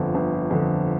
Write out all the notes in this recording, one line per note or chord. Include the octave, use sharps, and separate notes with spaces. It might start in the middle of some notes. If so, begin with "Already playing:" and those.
Already playing: G1 F2 D3 F3
G1
F2 D3 F3